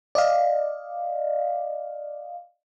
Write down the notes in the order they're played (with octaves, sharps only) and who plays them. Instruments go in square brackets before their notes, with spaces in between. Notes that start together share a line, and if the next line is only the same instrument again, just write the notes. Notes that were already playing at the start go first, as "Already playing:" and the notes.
[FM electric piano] D5 D#5 F5